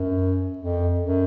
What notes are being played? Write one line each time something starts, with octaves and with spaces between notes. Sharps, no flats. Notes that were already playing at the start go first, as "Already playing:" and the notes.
Already playing: F#2
F2
F#2